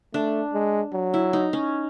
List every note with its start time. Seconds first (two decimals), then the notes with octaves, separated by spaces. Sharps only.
0.14 A3 D4
0.54 G#3
0.93 F#3
1.14 E4
1.33 D#4
1.53 C#4